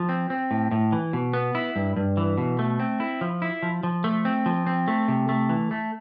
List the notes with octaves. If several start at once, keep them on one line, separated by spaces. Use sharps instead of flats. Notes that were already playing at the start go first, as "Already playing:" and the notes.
Already playing: F3
C4
C4
A2
A2
E3
B2
B3
E4
G2
G2
E3
B2
A3
C4
E4
F3
E4
F3
F3
A3
C4
F3
C4
A3
C3
A3
E3
A3